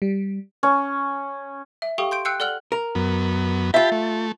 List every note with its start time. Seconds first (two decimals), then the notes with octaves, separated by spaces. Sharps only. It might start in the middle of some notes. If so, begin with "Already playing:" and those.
0.02 G3
0.63 C#4
1.82 E5
1.98 G4 A4 F5 G5 C#6 D#6
2.11 C6 G6 D7
2.25 G5 E6 F#6 G6 C7 C#7
2.40 A4 D5 F#5 F6 F#6 F#7
2.72 A#4
2.95 F#2 B3
3.74 F4 G4 E5 A5 B5
3.92 A3